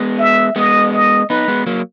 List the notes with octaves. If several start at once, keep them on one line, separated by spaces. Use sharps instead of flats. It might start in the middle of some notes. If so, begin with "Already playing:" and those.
Already playing: G#3 B3
E5
G#3 B3 D#5
D#5
B3 D#4 B4
G#3 B3
F#3 A#3